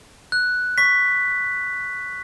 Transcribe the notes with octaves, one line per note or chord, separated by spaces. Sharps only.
F#6
C#6 B6